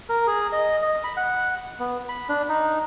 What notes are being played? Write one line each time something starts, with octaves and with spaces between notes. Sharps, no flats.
A#4
G#4
D#5
D#5
B5
F#5
B3
B5
D4
D#4